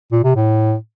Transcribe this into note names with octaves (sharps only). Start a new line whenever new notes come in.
A#2
C3
A2